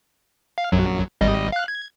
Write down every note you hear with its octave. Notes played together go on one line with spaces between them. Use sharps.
F5
A#1 F#2 F#3
G#1 G3 D#5
F5 F#6
G#6